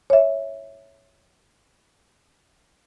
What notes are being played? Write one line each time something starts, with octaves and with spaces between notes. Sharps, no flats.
C#5 E5